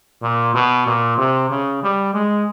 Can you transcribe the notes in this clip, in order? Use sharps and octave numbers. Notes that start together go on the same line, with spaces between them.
A#2
B2
A#2
C3
C#3
G3
G#3